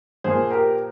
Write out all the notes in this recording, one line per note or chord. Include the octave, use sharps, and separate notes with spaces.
A#2 F3 A#3 G#4 C5
G4 A#4